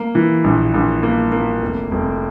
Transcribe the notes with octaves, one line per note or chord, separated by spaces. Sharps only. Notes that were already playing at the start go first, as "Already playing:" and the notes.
Already playing: A#3
E3
A#1
A#1
A#3
A#3
F1
F1